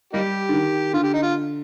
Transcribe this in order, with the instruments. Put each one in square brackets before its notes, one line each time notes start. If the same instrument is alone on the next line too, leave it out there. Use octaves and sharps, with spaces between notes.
[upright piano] G3 [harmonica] A#3 D#4 G4
[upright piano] D3
D#3
[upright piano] D3 [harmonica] F4
[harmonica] G4
D#4
F4